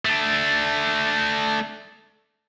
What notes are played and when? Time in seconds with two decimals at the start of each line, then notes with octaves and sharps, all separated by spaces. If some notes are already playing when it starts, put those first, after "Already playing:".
0.05 A3 D4